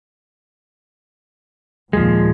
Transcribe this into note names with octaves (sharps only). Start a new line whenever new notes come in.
D#2 A#2 F3 G#3